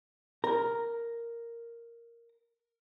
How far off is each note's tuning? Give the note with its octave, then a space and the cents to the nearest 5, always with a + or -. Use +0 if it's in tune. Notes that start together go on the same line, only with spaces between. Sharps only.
A#4 +0 A#5 +0